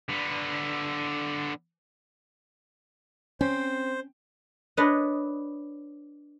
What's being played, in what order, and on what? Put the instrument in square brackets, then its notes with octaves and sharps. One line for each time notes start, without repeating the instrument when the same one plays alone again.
[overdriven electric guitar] D3 B3
[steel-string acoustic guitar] C4 [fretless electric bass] C#4 [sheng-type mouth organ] C5
[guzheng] D4 B4 C#5 D#5